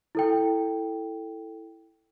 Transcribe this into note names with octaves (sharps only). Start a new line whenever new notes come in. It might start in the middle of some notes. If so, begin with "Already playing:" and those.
E4 A4 G5